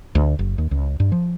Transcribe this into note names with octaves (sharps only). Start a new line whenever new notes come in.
D2
F#1
D#2
C#2
G2
F3